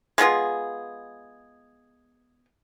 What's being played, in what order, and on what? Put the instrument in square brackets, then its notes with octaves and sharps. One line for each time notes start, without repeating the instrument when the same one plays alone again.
[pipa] G#3 B3 F4 G#4